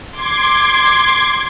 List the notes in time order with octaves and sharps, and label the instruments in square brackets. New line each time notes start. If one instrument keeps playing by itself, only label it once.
[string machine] C6 D6 G#6